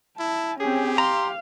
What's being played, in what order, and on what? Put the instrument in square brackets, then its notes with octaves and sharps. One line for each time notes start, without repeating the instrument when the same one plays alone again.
[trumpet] E4 [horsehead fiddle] A5
[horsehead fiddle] C4 C#4 [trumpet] G4 [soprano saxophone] G#4
[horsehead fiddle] F5 [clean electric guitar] A#5 [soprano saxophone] C6